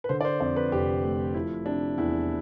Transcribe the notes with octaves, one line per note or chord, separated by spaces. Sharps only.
B4
D3 C5
D5
C5
F2 D5
B4
F1 G4
A3
F3 E4
C3 D4
E2 E4